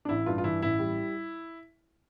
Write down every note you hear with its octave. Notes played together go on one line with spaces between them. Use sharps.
D4
A1 E4
G2 F4
F4
E3 E4
A1 E4
G3